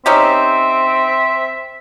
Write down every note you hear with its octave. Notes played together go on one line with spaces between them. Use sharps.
C4 C#4 D#4 G4 E5